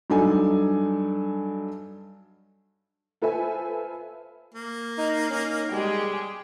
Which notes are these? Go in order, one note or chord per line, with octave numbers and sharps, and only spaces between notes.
G2 F#3 D4 D#4 A4 G#5
F4 A4 B4 C5 E5 G#5
A#3
D#4
C#4 D#4
G3 G#3 G4 G#4